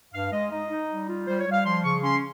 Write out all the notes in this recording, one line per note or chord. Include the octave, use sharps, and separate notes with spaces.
G2 F5
G#3 D#5
D#4 D#5
D#4
G3
F4
G3 C5
C#5
G3
F5
F3 C6
C#3 C#6
C#4 C6